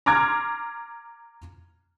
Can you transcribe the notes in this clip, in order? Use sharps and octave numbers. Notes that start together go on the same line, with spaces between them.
A#5 C6 D6 F6 G#6